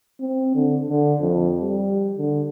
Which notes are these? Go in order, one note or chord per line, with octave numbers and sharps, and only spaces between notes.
C4
D3
D3
F2
G3
D3